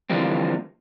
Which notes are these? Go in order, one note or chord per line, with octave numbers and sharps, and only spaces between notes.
D3 E3 F3 G3 A#3 C4